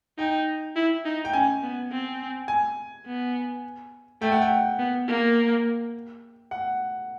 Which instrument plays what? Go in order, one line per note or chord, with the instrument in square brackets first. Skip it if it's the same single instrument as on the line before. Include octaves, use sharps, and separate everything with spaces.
[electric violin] D#4 [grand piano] G5
[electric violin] E4
D#4
[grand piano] G5
[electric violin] C#4 [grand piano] G#5
[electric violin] B3
C4
[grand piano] G#5
[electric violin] B3
[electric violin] A3 [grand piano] G5
[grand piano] F#5
G5
[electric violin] B3
A#3
[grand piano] F#5